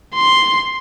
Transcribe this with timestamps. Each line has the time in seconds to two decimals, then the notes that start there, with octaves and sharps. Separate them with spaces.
0.14 C6